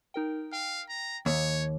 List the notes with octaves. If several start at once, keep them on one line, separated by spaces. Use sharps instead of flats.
D#4 A#4 G5
F5 G5
A#5
D#2 A#3 C#5